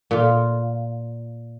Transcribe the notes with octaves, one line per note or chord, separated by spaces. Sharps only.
A#2 F4